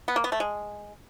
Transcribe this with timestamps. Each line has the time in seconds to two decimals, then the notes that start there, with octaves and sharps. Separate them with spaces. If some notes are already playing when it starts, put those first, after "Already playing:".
0.08 B3
0.16 A#3
0.24 B3
0.32 A3
0.40 G#3